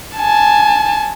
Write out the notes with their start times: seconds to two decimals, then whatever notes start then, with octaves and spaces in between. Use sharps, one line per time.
0.17 G#5 A5